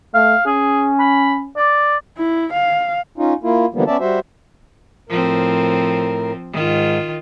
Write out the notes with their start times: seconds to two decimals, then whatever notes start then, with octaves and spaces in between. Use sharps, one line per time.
0.15 A3 F5
0.46 C#4 G#4
1.00 B5
1.57 D5
2.17 E4
2.53 F5
3.18 C#4 D#4 F4
3.43 A#3 E4 F4
3.75 D3 E3 F3 G3 A#3 B3
3.87 B3 C#4 D5 E5 A5
4.00 G3 F#4 C5 E5
5.09 A2 F3 C4 A#4
6.53 G#2 D#3 F4